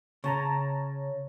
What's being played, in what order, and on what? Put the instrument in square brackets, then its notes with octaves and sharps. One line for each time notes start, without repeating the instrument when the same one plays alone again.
[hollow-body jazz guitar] C#3 [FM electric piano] C#5 A5 A#5